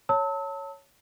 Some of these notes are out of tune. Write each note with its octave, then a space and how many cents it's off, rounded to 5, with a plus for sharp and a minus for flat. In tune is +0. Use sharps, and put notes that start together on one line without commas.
C#5 +0 A5 +25 E6 -35